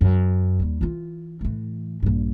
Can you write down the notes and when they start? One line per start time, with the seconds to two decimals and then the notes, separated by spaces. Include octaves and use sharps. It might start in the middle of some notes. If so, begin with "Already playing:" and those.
0.01 F#2
0.60 D#2 G3
0.81 E3 F4
1.41 A2 E3
2.03 A#1 G2